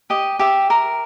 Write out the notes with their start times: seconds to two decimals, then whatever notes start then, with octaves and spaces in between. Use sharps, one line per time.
0.10 G4 D#5
0.39 G4 E5
0.70 A#4